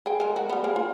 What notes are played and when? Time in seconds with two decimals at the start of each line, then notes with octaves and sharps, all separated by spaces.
0.06 G#4 G5
0.20 G#3 A#4
0.36 F#4
0.49 G3 B3
0.64 A#3 G#4 G5
0.76 F4